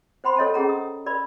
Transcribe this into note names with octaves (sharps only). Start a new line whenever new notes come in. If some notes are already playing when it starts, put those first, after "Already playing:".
C5 F#5 B5 C6
A4 C#5 D#5 G5 A5
C#4 G#4 F#5 A#5
D#6
A#4 D5 B5